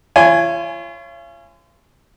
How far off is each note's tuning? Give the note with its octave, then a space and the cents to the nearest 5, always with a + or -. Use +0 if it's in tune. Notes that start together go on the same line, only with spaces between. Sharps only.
F4 -45 C#5 -10 G#5 +0